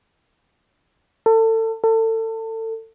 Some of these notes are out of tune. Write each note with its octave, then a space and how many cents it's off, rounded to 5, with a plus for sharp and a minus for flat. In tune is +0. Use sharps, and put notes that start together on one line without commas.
A4 +30
A4 +30